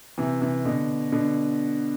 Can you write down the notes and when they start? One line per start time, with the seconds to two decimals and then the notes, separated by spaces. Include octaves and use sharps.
0.18 C3 E3
0.41 C3 E3
0.65 B2 D3
1.12 B2 D3